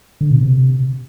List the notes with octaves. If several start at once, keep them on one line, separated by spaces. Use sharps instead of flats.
D3
B2
C3